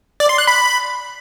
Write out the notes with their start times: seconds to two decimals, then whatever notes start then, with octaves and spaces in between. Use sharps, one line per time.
0.20 D5
0.29 C6
0.38 F#6
0.47 B5